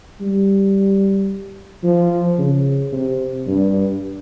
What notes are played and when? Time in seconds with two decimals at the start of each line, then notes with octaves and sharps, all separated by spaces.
0.20 G3
1.84 F3
2.38 C#3
2.93 C3
3.47 G2